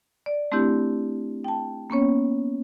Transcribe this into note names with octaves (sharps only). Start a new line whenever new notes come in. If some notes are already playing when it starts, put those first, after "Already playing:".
D5
A3 C4 D4 E4 G4
G5 A5
A#3 B3 C#4 C#5